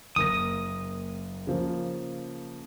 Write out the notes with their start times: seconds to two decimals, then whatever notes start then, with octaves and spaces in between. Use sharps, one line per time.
0.16 F#1 A#3 D#6 A#6
1.47 C#3 F3 A#3